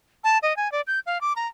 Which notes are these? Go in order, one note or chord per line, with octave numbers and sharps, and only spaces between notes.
A5
D#5
G#5
D5
G6
F5
D6
A#5